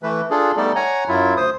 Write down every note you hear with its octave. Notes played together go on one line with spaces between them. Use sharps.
E3 A3 B4
D4 F4 G#4 A4
G3 A3 B3 D#4 A4 D5
C#5 F#5 G#5 A#5
F#2 F#3 E4 F4
D2 C5 D#6